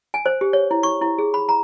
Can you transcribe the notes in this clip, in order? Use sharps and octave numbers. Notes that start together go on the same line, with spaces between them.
G#5
C5
G4
C#5
E4
C#6
E4
G#4
B5
A#5